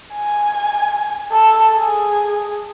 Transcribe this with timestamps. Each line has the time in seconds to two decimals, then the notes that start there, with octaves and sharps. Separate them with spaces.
0.15 G#5
1.32 A4
1.76 G#4